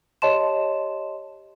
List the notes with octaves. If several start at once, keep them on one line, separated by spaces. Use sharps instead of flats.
G4 C#5 D#5 A5 C6 E7